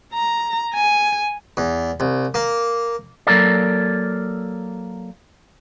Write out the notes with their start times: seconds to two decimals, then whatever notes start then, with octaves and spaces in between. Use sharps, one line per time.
0.14 A#5
0.75 G#5
1.57 E2
2.00 C2
2.34 A#3
3.27 F#3 A#3 A4 A#4 D5